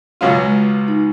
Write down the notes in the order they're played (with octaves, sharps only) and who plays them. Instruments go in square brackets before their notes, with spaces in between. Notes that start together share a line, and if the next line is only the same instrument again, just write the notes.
[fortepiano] C#2 B2 F#3 C#4 F4
[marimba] G#3
D#4